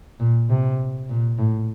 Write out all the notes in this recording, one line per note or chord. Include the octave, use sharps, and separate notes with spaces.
A#2
C3
A#2
A2